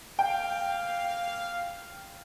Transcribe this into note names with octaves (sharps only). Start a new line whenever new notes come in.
A#3 F5 G5